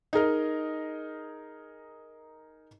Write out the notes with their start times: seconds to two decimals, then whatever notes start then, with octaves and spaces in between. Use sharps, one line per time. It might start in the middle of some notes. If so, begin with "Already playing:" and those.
0.13 D#4 G#4 A#4 D#5